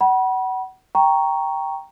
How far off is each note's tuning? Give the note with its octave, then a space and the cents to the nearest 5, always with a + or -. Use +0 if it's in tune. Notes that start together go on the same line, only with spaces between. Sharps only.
F#5 +30 B5 -35
G5 +0 A#5 +0 C#6 +0